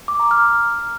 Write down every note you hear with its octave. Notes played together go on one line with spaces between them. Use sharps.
D6
A#5
F6